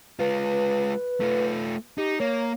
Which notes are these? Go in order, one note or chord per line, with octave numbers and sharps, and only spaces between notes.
G#3 F4 B4
A3 F4
D#4 G4
A#3 C#5